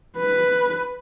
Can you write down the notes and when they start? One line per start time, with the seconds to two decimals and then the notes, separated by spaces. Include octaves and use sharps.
0.17 B4